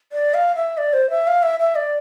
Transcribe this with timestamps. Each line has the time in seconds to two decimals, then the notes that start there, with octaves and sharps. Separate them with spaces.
0.12 D5
0.34 F5
0.56 E5
0.78 D5
0.93 C5
1.10 E5
1.27 F5
1.43 E5
1.60 E5
1.76 D5